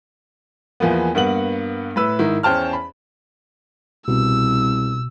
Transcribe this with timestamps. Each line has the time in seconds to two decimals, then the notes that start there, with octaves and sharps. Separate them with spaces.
0.80 E2 E3 F3 A#3 B3
1.15 G2 A#3 B3 F#5 F#7
1.96 A2 B4 E6
2.19 G#2 D#3 E4
2.43 E2 C#4 C5 G5 A5 F6
2.73 B5
4.08 C2 B2 E6